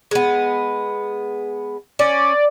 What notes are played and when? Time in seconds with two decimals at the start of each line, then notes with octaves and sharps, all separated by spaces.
0.11 G#3 B3
1.99 C#4 D5